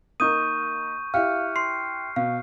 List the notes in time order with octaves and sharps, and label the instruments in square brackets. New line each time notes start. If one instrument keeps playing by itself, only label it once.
[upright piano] A#3 D#4 A#4 [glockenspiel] C#6 G6 D#7 [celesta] D#6
[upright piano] E4 G4 [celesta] F5 [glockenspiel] F6 F#6 C#7
[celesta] C6 [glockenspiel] C7
[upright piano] B2 [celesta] F5